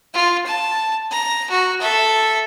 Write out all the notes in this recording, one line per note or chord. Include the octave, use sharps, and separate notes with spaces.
F4
A5
A#5
F#4
A4 E5